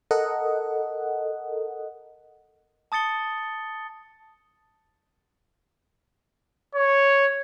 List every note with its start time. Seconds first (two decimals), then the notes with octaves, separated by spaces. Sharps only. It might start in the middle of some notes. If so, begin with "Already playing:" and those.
0.11 A4 A#4 D#5 F#5
2.92 A5 D#6 A6 C#7 G7
6.75 C#5